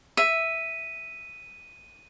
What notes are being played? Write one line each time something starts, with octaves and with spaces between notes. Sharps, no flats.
E5 D#7